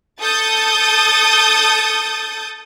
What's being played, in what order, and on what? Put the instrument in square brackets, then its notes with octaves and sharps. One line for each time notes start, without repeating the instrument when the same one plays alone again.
[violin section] A4 D#6 G6 A6